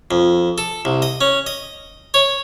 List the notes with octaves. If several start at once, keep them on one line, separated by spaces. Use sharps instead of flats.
F2
A4
C2
D#5
C#4
D#5
C#5